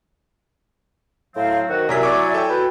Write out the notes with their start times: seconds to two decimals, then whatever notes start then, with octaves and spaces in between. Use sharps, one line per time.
1.36 A2 F#3 C4 F5
1.69 D#3 F#4 C5
1.89 C3 F#3 E4 A#4 D5 E5 G#5 B6
2.03 D5 C#6 D6
2.34 A4 G5
2.49 F#4 B4